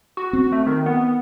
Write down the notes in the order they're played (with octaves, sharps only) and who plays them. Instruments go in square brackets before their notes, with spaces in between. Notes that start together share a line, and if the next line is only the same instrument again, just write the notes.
[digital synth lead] F#4
[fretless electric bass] C4
[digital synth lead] A3
D#3
B3